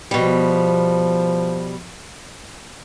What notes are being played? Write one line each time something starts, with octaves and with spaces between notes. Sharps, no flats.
B2 F3 G3